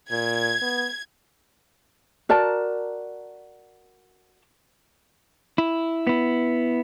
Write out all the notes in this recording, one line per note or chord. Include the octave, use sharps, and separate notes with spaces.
A#2 G#6
B3
F#4 A#4 D5 A5
E4
B3 E4